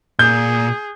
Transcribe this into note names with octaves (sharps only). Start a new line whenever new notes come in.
A#2 G#4 G6